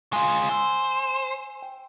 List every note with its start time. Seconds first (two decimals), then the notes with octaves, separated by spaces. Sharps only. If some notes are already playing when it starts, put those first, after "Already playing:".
0.13 G#3 F4 G#5 C6
0.49 C5 G#5 E6
1.62 G5